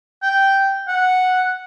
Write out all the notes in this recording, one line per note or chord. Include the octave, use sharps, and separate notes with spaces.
G5
F#5